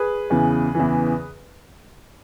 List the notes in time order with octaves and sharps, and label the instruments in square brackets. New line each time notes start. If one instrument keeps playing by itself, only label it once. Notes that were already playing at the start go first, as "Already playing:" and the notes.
Already playing: [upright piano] G#4 B4
E2 C#3 E3
E2 C#3 E3